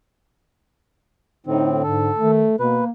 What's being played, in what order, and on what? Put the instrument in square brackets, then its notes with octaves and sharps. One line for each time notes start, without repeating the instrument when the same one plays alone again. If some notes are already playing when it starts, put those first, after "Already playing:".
[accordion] A2 C4 [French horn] D3 [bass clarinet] D#4
[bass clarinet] G#2 [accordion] A4
[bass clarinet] D#3 [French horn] A3
[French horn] B2 [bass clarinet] A#3 [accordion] B4